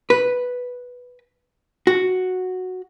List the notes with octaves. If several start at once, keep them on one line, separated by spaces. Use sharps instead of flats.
B4
F#4